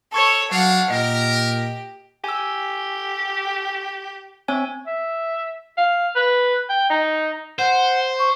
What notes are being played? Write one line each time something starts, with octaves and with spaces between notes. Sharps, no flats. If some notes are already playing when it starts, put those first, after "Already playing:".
A4 C#5 A5 C#6 G#6
F#3 D4 F5 F#5
A#2 G4 A#4 D#5
G4 G#5 E6
C4 C#5 E5 G#5
E5
F5
B4
G5
D#4
C5 F#5
C#6